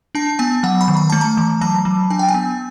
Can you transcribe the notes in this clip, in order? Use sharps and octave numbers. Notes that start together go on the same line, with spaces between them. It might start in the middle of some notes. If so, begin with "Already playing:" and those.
D4 A5
B3 G#5
F#3 F#5
B5
D#3
A#5
A3 A5
A#5
E3
F#3 A5
F#3
D4 G#5
G5
G#5
B3